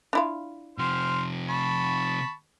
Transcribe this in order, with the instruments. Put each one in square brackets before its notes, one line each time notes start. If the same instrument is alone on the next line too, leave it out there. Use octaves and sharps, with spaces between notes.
[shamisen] D4 E4 F4
[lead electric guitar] C3 F3 [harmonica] C5 C6 F6
[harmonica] A5 B5 C#6